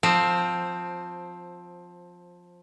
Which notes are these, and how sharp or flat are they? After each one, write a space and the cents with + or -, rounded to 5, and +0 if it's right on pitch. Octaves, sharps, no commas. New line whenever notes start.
F3 +15 C4 +5